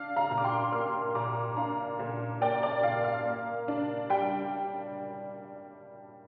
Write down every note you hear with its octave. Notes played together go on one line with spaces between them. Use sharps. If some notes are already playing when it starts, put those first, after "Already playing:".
Already playing: D4 F5
F5 A#5
A#2
D6
G5 C6
A#3 C6 F6
A#2 A#5 D6
D4 F5 A#5
A#2
A#3 D5 G5
D5
A#2 F5
F5
A#3
D4
G3 G5